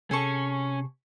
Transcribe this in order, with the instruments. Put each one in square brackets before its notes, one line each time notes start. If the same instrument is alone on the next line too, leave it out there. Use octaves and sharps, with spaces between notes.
[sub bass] C3 [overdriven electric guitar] C#4 [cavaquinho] G#4 A4 C#6